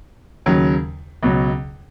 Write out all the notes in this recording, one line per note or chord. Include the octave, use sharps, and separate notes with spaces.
D#2 C#3 F#3
C#2 B2 F#3